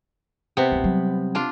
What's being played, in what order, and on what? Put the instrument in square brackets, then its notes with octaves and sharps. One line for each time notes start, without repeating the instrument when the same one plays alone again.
[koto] C3 B3
[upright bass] A#1 E4
F#3 G3
[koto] D4 F4